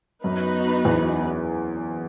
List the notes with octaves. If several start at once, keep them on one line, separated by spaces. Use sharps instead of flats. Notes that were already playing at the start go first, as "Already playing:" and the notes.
F#2 B3 D#4 F#4 B4
E2